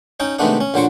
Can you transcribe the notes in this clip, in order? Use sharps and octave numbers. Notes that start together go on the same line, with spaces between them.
C#4 D#4 G5
C3 D#3 G#3 A3 B3 D4
C#4
A#1 D3 F#3 C5 G5 C#6